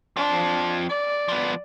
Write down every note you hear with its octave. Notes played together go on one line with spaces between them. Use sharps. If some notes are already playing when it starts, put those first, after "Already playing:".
F3 C4 D4
D5
F3 B3